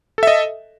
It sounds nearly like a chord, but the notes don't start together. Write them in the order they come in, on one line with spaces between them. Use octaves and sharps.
A4 E5 D#5